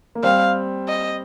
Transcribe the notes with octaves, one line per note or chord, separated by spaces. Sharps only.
A#3
G3 C4 F5
D#5